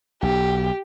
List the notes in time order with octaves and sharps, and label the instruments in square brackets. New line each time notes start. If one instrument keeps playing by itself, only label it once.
[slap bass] B1 [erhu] G4